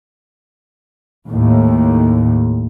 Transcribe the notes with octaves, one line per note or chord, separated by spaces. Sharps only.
D#2 A2